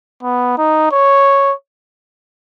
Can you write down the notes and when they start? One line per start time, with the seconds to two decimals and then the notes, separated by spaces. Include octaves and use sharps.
0.23 B3
0.58 D#4
0.92 C#5